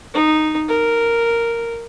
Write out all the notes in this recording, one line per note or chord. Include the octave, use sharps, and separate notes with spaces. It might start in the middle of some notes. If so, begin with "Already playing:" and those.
D#4
A#4